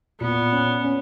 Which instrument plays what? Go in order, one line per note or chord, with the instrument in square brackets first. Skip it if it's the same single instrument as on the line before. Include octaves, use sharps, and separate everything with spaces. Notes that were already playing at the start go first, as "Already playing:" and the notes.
[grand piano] A#2 [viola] B3
[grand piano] C#4
C#4